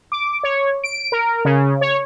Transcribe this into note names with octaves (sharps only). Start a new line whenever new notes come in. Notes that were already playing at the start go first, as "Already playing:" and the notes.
D6
C#5
D7
A#4
C#3
C#5